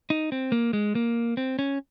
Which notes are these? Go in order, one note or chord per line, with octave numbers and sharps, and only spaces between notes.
D#4
C4
A#3
G#3
A#3
C4
C#4